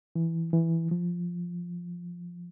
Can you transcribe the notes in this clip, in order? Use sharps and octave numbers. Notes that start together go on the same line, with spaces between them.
E3
E3
F3